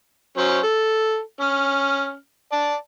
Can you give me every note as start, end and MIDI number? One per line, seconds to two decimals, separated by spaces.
0.38 0.59 54
0.38 0.59 61
0.38 0.59 72
0.63 1.19 69
1.41 2.14 61
1.41 2.14 89
2.52 2.76 74
2.52 2.76 81